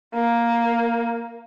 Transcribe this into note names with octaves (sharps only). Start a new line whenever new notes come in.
A#3